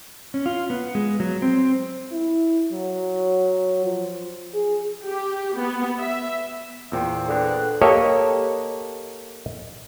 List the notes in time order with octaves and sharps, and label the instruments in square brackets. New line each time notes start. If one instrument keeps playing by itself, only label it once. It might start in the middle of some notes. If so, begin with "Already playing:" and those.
[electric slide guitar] C#4
F4
B3
G#3
F#3
C4
[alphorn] E4
F#3
F3
G#4
[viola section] G4
B3
E5
[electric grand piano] E2 A#2 C5 [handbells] G5 E6
[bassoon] D3 [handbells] G#4 B4 G5
[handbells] F#6
[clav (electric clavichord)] A#3 G4 A4 C#5 D#5